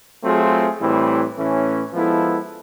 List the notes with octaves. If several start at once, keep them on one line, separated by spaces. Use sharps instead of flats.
F#3 A3 C4 F4 G#4
A2 E3 G3 C4 E4
A2 E3 A3 C#4
F3 G#3 B3 E4 A4